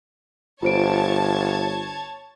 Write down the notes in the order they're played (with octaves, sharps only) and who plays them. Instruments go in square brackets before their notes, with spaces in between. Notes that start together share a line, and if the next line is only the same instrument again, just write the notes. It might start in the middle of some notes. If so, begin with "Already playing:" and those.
[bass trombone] G1 [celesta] F4 C5 D7 [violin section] C#5 A5 G#6